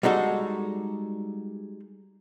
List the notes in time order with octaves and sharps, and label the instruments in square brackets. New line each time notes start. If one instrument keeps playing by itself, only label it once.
[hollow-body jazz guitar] G3 G#3 D#4 F#4 A4